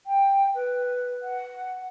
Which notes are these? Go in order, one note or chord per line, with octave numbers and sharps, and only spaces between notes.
G5
B4
F#5